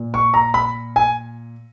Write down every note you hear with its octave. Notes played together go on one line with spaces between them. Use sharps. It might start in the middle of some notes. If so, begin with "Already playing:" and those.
Already playing: A#2
C#6
A#5
B5
G#5